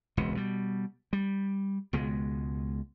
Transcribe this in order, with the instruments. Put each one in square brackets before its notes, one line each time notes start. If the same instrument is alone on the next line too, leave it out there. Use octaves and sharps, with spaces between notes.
[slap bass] E1 C#2 C3
B2 G3
G3
C#2 B2 G#3